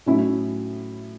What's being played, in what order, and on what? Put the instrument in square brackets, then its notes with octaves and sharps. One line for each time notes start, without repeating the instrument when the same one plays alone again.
[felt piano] A2 F#3 C#4 E4